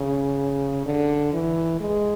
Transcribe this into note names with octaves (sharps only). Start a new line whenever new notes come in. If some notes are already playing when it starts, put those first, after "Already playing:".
Already playing: C#3
D3
E3
G#3